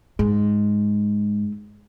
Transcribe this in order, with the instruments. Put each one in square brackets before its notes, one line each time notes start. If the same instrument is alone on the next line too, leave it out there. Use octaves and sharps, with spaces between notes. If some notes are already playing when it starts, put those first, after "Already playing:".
[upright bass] G#2 [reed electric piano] G#3